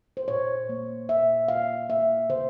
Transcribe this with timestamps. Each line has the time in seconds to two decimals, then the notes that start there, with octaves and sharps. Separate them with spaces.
0.17 C5
0.28 A#2 C#5
0.69 A#3
1.09 A#2 E5
1.48 A#3 F5
1.89 A#3 E5
2.29 C#3 C5